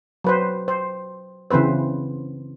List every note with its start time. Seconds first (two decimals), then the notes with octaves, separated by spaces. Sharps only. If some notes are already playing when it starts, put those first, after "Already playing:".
0.24 F#3 B4 C5
0.68 C5
1.51 C#3 E3 C4 B4 C5